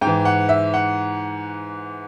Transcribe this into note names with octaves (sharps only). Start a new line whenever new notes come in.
G#2 G5
E3
F#5
E5
F#5